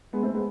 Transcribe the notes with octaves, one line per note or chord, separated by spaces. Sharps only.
G#3 B3
A3 C4
G#3 B3